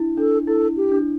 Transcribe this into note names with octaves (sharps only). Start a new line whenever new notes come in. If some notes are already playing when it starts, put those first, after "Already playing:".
Already playing: D4 E4
D4 A4
E4 A4
G4
D4